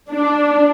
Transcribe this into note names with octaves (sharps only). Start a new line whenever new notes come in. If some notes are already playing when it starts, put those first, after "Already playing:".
D4